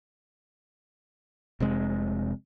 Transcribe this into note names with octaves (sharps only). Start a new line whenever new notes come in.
F1 C3 G#3